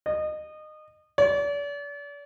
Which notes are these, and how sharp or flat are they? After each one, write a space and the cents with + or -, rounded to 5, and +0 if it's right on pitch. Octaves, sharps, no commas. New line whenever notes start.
D#5 -25
D5 -40